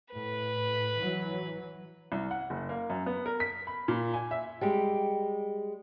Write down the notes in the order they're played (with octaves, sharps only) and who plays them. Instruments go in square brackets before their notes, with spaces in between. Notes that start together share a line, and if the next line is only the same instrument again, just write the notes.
[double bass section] A2 [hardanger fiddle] B4
[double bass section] E3 F#3
[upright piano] C2
F#5
F#1
A#3
F#2
B3
A#4
B6
B5
A#2
G#5
E5
[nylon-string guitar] G3 G#3 G4